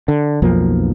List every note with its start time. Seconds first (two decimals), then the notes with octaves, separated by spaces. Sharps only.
0.08 D3
0.42 B1 F2 F3 A#3